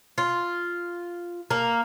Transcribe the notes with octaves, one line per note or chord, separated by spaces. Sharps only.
F4
A#3